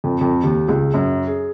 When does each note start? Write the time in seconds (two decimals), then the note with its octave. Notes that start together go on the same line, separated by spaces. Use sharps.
0.04 F2
0.21 F2
0.44 D#2
0.68 C#2
0.94 F#2
1.27 G#4